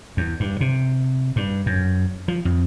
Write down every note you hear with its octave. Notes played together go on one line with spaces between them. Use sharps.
E2
G2
C3
G2
F#2
F3
F2